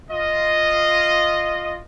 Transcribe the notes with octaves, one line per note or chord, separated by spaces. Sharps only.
F4 D#5